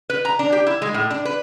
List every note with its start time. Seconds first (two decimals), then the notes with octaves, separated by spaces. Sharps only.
0.10 B4
0.25 A#5
0.39 D4
0.52 G4
0.67 E4
0.82 G#3
0.94 A2
1.10 D4
1.25 B4